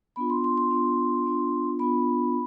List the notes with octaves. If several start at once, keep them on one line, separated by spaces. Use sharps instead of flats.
B3 D4 F4 B5
C6
C6
C6
B3 D4 F4
B3 D4 F4
B3 D4 F4 B5